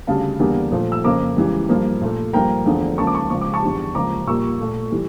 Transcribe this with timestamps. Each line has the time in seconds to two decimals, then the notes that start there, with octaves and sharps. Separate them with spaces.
0.07 D2 C#3 G3 F5 A5
0.39 E2 D3 G3 A#3
0.72 A#2 F3 A3
0.92 E6
1.04 F2 C#3 F3 A#3 A#5 D6
1.36 C#2 C#3 E3 G3
1.69 G2 F3 A#3
2.01 A#2 A3
2.33 G2 F3 A#3 G5 A#5
2.66 E2 D3 F3 A3
2.98 C#2 C#3 F3 A#3 A5 C#6
3.07 D6
3.15 A5 C#6
3.30 C#2 C#3 F3 C#6
3.41 D6
3.53 A5 C#6
3.62 E2 D3 G3
3.95 C#2 C#3 F3 A#3 A#5 D6
4.27 A#2 G3 A#3 C#6 E6
4.60 A#2 A3
4.92 E3 G3